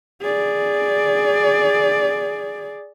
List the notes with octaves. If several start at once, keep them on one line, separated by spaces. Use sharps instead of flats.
G#4 D5